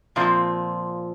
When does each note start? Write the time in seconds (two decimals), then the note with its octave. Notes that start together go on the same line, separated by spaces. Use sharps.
0.16 A#2 F3 C4